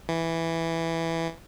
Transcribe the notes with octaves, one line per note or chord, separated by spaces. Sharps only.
E3